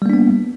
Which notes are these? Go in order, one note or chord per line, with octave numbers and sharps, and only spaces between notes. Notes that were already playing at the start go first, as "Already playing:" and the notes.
G3 A#3 B3 D4